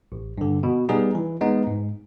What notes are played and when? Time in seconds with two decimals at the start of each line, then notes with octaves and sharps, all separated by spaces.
0.12 A1
0.38 G2 D3
0.63 B2
0.89 G3 B3 D#4 G#4
1.15 E3
1.41 G#3 B3 D#4
1.67 G#2